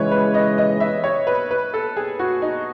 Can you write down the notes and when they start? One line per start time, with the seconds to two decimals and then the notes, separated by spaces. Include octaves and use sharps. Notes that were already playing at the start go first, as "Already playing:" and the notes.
Already playing: C#3 E3 G#3 B4 C#5
0.11 B4
0.34 D#5
0.58 D#5
0.80 E5
1.04 C#5
1.27 B4
1.51 B4
1.74 A4
1.96 G#4
2.19 F#4
2.42 D#4